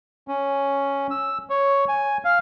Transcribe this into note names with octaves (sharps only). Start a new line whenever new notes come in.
C#4
E6
C#5
G#5
F5